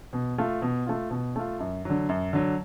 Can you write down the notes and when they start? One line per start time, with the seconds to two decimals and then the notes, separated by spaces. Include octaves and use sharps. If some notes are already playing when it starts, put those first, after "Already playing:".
0.13 B2
0.38 A3 F4
0.62 B2
0.86 A3 F4
1.11 B2
1.36 A3 F4
1.60 F#2
1.85 D3 F#3
2.09 F#2
2.33 D3 F#3